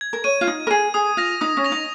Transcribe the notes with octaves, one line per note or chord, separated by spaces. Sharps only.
G#6
A#4
C#5 D#7
F4
D#4 G#6
A#4
G#4 D#7
G#4 D#6
F4 A#6 F7
D#4 D#6
C#4
A#6 F7
D#4